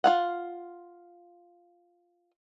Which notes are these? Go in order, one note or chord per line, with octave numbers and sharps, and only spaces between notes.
F4 F5 F#5